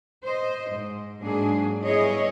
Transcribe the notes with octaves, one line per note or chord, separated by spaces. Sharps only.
C5 D#5
G#2
G#2 F#3 A#3 D4 G#4
G3 B3 E4 G#4 C#5 D#5